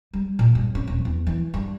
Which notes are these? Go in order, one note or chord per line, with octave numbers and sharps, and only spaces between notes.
G3
A#2
G2
C#4
D#1
E2
E3
G2